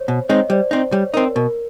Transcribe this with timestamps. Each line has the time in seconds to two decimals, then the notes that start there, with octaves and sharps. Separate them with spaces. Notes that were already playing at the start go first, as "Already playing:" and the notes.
Already playing: C5 C#5
0.08 B2
0.29 G#3 C4 D#4 C#5 D#5
0.50 G3 C5 D5
0.71 C4 D#4
0.92 G3 C#5
1.14 C4 D#4 A#4
1.35 B2 A#4